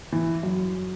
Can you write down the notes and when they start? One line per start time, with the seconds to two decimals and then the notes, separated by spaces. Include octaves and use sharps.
0.12 E3
0.43 F#2